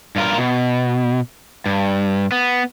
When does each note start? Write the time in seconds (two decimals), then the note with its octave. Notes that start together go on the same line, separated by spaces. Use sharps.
0.16 G2 F4 A#4
0.38 B2
1.66 G2
2.32 B3